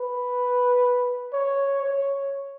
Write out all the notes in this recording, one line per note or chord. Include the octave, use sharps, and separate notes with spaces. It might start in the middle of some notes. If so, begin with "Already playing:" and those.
Already playing: B4
C#5
C#5